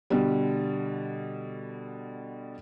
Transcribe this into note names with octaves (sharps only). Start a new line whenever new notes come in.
B2 D3 G3